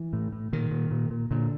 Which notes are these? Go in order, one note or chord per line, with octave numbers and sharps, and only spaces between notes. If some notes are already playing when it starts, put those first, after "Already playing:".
Already playing: E3
A2
A2
A#2 D#3
A#2
A#2
A#2
A#2 D3